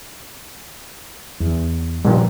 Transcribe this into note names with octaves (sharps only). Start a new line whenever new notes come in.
E2
G2 A#2 D#3 F3